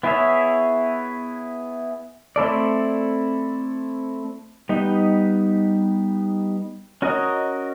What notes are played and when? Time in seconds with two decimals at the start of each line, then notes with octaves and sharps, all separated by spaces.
0.03 B3 E4 G#4 C#5 E5
2.36 A3 C4 E4 A4 D5
4.69 G3 B3 D#4
7.02 C#4 F#4 A#4 D#5